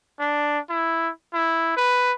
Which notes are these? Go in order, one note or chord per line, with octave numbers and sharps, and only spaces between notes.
D4
E4
E4
B4